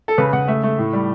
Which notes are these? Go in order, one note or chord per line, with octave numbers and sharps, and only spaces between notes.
A4
C#3 B4
C#3 F#5
A3 E5
A3
A2
G3